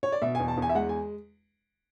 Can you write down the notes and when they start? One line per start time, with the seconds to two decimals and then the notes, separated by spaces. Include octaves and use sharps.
0.03 C#5
0.12 D5
0.22 B2 E5
0.35 G#5
0.40 E2
0.48 A5
0.57 E2
0.62 G#5
0.69 E5
0.75 G#3 F#5
0.89 G#5